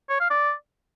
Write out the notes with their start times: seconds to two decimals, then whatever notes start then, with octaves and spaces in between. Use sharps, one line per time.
0.10 C#5
0.20 F5
0.30 D5